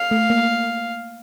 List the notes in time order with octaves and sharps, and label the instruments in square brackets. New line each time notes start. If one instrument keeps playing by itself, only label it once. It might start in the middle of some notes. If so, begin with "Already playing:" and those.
Already playing: [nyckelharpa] F5
[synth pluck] A3
A#3